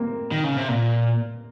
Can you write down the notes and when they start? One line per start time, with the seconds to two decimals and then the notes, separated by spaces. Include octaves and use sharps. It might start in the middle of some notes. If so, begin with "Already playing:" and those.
Already playing: A#3 C4
0.32 D#3
0.44 C#3
0.57 C3
0.68 A#2